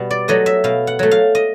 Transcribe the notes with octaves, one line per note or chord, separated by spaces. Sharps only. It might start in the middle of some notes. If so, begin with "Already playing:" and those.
Already playing: B2 G3 B3
D5
F#3 A3 D#5
E5
B2 F5
F#5
F#3 A3
F5
D#5